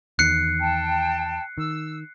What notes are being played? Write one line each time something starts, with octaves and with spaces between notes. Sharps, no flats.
E2 D#3 F#6 C7 C#7
G5 A5
D#3 E6